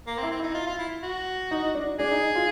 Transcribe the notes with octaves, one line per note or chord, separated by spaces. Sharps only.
A#3
C4
E4
C4
D#4 E4
F4
F4
E4
F#4
D#4
D4
D4 G#4
D#4
F4